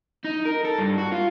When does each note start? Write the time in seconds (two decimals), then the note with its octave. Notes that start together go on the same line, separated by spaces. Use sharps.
0.24 D#4
0.45 A#4
0.65 A4
0.78 G2
0.98 F#4
1.12 F4